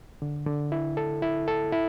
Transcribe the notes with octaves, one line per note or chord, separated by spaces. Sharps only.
D3
D3
E4
A4
E4
A4
E4